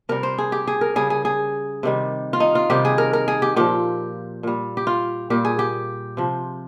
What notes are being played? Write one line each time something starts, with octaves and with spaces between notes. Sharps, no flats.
C3 G3 A#4
C5
G#4
G4
G#4
A#4
C#3 G3 G#4
G#4
G#4
C3 D#3 G3
F4
D#4
F4
C3 D#3 G3 G4
G#4
A#4
A#4
G#4
G4
A#2 F3 G4
A#2 G3
G4
F4
A#2 G3 G4
G#4
G4
C3 F3